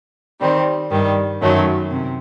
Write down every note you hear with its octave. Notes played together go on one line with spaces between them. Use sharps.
D#3 G3 C4
G2 D#3 G3
F#2 D#3 F#3 A3 C#4
C3